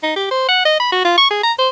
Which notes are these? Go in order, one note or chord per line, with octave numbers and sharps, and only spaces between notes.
D#4
G4
C5
F#5
D#5
B5
F#4
F4
C#6
G#4
A#5
C5